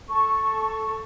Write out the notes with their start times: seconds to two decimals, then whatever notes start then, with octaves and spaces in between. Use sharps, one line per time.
0.07 A4 C#6